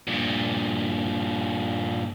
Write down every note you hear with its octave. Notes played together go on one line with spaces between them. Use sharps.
G2 A#2